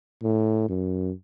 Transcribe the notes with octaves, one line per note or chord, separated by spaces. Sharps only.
A2
F#2